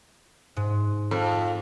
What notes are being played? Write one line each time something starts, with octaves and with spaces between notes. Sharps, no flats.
G#2
F2